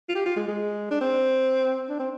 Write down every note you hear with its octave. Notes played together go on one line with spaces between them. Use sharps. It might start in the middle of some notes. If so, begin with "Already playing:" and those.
F4
G4
F4
G#3
G#3
D4
C4
D4
C4